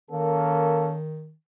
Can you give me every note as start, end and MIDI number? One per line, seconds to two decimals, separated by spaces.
0.10 1.33 51
0.10 0.96 58
0.10 0.96 61
0.10 0.96 69